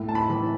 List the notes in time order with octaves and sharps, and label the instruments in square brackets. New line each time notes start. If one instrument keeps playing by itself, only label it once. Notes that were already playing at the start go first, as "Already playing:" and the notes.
Already playing: [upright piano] A2
A5
B5
E3